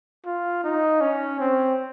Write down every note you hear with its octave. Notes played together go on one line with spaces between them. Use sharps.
F4
D#4
C#4
C4